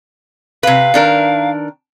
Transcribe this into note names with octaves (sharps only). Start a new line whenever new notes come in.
C3 B4 F5
D#3 D4 A#4